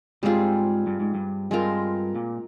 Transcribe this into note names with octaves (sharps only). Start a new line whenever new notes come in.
G#2 G3 C4 F4 G#4
G2
G#2
G2
G2 G#3 C4 F4 A#4
A#2